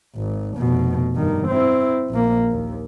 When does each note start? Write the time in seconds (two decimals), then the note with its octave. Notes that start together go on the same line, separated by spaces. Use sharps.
0.16 G#1
0.58 F1 B2
1.16 G2 D#3
1.48 C4 E4
2.10 A#1 A#3
2.51 D#2